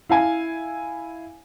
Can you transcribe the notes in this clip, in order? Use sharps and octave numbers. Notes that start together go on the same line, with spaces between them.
E4 F5 G#5